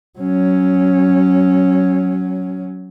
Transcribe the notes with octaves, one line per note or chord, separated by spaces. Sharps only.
F#3 C#4